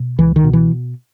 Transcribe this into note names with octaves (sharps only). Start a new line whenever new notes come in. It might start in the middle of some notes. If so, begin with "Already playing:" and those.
Already playing: B2
C#2 E3
D#3
B2
E3